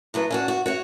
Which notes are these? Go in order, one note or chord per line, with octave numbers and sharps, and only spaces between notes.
A2 F#3 B4
C#4 D4 F#4
F#4
F#4 C#5 F#5